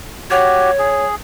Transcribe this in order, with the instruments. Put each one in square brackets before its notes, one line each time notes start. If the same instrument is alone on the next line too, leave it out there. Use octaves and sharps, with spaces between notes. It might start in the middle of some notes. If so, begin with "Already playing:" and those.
[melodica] F#4 G4 [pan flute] C#5
[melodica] G#4